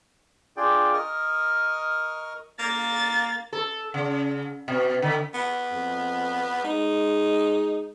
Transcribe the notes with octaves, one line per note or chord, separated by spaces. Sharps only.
D4 F4 G#4 D5 G5
A#4 D#5 C#6 D#6 F6
A#3 A6
A4
C#3
B2
D3
B3
F2
G#3 D#4